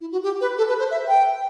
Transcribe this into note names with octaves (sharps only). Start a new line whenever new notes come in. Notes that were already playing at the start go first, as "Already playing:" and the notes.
E4
F#4
G4
B4
A4
B4
C5
E5
G5